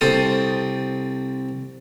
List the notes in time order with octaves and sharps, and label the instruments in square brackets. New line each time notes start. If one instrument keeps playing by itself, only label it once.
[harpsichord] C2 C4 A4 C5 D#6